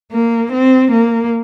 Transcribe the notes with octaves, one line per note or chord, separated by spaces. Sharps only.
A#3
C4
A#3